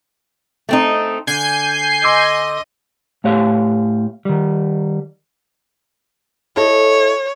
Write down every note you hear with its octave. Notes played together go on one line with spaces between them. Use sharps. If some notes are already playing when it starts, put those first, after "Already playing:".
A3 C4 D#4
D3 G#5 G6 C7
D#5 C6 D6 E6
A2 A3 G4 C#5 F5
D#3 G3
E4 A4 C#5 D#5